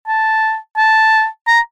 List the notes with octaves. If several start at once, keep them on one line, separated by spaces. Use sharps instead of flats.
A5
A5
A#5